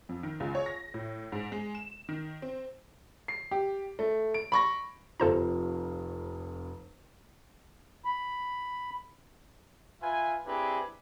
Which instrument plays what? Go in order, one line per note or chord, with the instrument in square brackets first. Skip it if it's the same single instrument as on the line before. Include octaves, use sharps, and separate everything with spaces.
[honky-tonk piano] F2
D#3
C#2
C#5
A#6
A2
G#2
G#3
E7
D#3
C4
[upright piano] C7
G4
A3
D7
B5 C#6 A#6
[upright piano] F1 F2 F4 [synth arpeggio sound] A4 C5 A#5
[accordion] B5
[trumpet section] F4 B4 E5 G#5
C4 D4 E4 G4 G#4 B4